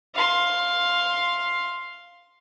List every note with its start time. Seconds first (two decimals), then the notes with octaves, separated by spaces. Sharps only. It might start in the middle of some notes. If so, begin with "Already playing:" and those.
0.15 F5 C6